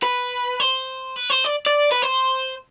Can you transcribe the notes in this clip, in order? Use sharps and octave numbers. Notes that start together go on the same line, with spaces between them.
B4
C5
B4
C5
D5
D5
B4
C5